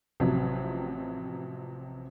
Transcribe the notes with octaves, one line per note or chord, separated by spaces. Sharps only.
A1 C3 F3 F#3